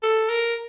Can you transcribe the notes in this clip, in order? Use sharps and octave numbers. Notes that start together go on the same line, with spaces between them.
A4
A#4